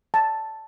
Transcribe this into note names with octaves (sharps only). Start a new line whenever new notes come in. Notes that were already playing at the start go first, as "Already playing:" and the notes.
A5